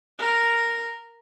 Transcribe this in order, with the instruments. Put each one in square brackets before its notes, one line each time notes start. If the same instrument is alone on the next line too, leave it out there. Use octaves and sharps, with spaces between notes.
[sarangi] A#4